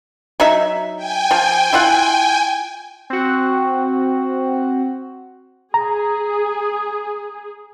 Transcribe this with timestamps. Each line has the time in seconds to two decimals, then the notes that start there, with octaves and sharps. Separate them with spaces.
0.40 F#3 D#4 E5
0.96 G5 G#5
1.31 F3
1.73 E4 F4 F#5
3.10 C4 F#4
5.74 G#4 A#5